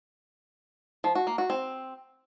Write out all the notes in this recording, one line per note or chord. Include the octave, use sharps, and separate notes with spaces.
F3
F#4
A#3
F#4
C4